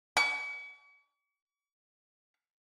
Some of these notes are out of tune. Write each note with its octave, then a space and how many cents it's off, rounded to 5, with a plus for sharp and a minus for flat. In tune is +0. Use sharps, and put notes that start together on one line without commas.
C#6 +45